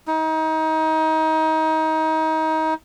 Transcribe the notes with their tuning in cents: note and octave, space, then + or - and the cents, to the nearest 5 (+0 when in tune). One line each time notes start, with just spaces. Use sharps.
D#4 +25